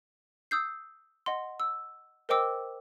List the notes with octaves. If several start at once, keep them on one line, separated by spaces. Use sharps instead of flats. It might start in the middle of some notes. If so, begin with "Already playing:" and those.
D#6 E6 G6 C7
D#5 F#5 C6
E6
A#4 C5 D#5 G5 D6 E6